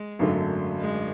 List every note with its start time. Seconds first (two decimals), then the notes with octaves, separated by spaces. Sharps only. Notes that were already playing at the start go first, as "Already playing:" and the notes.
Already playing: G#3
0.19 G#1 F#2 D3 F#3 A3
0.80 G#3